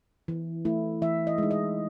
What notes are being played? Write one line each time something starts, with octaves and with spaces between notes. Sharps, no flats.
E3
A3 E4
E3 E5
D#5
G#3 D#4
D#5